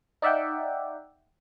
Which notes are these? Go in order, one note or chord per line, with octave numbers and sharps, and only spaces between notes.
D#4 D5 E5 F#5 G5